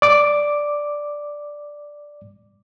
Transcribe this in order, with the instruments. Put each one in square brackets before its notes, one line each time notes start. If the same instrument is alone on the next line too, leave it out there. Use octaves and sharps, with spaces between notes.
[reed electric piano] D5 D6